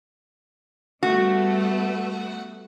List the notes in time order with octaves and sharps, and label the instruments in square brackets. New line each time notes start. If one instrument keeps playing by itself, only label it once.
[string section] G3 A3 B3 [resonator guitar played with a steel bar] F#4